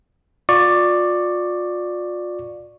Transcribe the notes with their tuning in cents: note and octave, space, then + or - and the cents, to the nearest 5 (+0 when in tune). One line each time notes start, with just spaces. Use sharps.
F4 +35 D5 +10 C#6 +0